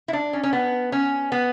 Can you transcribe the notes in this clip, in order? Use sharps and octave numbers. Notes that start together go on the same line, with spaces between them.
E4
D4
C#4
C#4
B3
C#4
B3